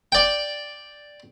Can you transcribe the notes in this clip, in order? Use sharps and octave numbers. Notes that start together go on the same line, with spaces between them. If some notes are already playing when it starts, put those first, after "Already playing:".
D5 G5